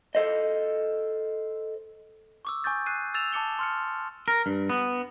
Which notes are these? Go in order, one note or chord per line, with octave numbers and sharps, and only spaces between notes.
A4 C5 D#5
C#6 D6 E6
G#5 C#6 D#6 G6 A6
F#6 C7 D#7
E6 A6 E7 F7
A5 D6 C#7 G7
C6 F6 C#7
A#4
G2
B3